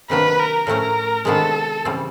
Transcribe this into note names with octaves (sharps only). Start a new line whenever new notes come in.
C3 D#3 F#3 A#3 D4 B4
A#4
A2 F3 A3 C#4 A#4
C3 D#3 G#3 B3 D4 A4
C#3 E3 G3 C4